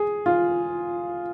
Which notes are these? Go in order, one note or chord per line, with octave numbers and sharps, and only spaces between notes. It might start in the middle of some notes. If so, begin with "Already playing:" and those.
Already playing: G#4
F4